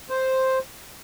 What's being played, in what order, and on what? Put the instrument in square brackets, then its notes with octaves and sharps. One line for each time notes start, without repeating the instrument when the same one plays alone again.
[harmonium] C5